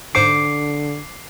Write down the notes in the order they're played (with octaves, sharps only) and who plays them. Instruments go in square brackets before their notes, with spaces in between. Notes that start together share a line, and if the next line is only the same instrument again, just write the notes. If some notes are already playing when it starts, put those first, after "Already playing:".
[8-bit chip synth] G#2 C5 C#7 [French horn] D3 [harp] D6 [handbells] C7